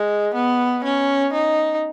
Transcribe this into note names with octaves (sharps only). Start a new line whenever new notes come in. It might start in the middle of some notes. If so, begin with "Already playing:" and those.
Already playing: G#3
B3
C#4
D#4